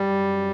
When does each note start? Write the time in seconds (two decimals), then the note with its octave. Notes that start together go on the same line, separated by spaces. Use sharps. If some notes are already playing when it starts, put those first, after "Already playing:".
Already playing: F#2 G3